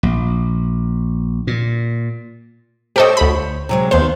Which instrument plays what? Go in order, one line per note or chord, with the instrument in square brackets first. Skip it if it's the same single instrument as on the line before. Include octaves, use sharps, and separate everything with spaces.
[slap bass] A#1
A#2
[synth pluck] G4 A4 D#5 [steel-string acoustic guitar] C5 C#5
[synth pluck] D2 B5
[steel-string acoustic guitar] C3 F#3 G#3
[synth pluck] D#2 C5 [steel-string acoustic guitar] B3 F5